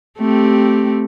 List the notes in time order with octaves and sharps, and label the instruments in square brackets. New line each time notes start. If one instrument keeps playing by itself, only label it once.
[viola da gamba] A3 C4 G4